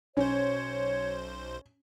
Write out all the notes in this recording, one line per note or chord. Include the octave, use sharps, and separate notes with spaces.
B1 C#4 C5 C#5